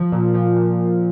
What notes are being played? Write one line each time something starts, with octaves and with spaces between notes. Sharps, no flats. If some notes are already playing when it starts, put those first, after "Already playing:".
Already playing: F3
A#2
F3
A#2